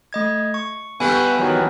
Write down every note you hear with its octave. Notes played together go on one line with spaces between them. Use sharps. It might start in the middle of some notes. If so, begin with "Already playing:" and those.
A3 D#5 G#6
C#6
D3 G3 A3 B3 B4 G#5
D#3 E3 F#3